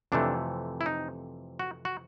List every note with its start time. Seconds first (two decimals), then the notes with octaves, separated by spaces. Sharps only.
0.12 F2 C3 E3 A3 D4
0.81 E4
0.86 D#4
1.59 F#4
1.85 F#4